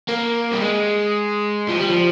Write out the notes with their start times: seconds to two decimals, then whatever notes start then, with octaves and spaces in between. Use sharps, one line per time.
0.08 A#3
0.53 G3
0.62 G#3
1.68 F3
1.79 G3
1.89 F3